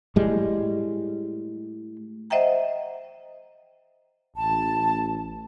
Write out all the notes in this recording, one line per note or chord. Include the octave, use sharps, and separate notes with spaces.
A2 G3 G#3
C5 D#5 E5 F#5 G5 A#5
A1 A5